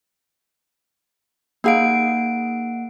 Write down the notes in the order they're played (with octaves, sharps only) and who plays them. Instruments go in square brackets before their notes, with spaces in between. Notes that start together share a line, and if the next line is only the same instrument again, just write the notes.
[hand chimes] A#3 F#5 D7 [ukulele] D#4 G#4 F5